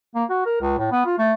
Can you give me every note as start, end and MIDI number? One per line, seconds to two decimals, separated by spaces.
0.15 0.25 58
0.30 0.45 66
0.46 0.59 70
0.61 0.76 37
0.78 0.89 45
0.92 1.02 59
1.06 1.17 65
1.18 1.33 57